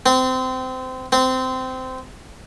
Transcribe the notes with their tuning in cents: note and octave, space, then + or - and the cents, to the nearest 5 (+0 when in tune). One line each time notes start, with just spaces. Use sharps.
C4 -25
C4 -20